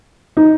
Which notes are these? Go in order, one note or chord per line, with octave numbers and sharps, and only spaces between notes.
D#4